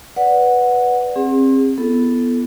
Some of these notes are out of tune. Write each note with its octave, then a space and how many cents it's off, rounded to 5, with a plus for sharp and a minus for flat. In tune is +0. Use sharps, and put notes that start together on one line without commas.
B4 +0 D5 -15 F#5 -10
C4 +30 G#4 -35
B3 +0 E4 +30 A4 -10